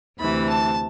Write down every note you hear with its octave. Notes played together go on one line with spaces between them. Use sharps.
D2 C3 E3 B5
A5